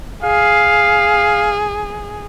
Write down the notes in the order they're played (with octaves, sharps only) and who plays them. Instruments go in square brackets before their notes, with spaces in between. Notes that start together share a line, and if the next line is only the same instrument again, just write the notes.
[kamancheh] G#4 [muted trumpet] F5